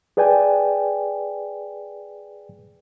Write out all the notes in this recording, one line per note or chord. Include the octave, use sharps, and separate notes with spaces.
G#4 B4 D5 G5 G#5